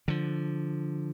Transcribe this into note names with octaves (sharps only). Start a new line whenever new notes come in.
D3 F3